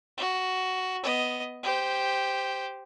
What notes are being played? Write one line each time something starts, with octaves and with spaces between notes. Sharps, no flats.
F#4
B3 D#5
G4 C5